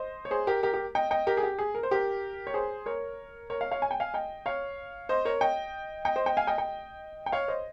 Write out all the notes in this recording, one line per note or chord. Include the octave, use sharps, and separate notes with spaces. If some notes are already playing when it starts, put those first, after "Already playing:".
Already playing: C5 D#5
C#5
G#4 C5
G4 A#4
G4 A#4
G4 A#4
D#5 G5
D#5 G5
G4 A#4
G#4
G4
G#4
A#4
C5
G4 A#4
C#5
G#4 C5
A#4 C#5
A#4 C#5
C#5 F5
C#5 F5
G#5
G5
F5 G#5
D#5 G5
C#5 F5
C5 D#5
A#4 C#5
D#5 G5
D#5 G5
C5 D#5
D#5 G5
F5 G#5
D#5 G5
D#5 G5
G5
C#5 F5
C5 D#5